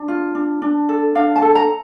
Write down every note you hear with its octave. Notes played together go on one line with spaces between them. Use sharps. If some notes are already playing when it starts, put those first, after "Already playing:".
Already playing: D4
F4
D4
D4
A4
D4 F5
A5
A4
A#5